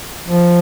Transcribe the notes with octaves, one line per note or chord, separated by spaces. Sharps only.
F3